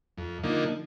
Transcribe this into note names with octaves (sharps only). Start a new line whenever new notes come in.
F2
D3 F3 A#3 D#4